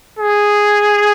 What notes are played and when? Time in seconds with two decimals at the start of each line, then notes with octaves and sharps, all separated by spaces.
0.19 G#4